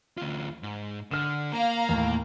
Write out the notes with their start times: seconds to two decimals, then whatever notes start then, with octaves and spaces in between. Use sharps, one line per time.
0.18 D2 F4
0.63 G#2
1.11 D3 F6 E7
1.52 A#3 F5 A#5
1.89 D#2 A2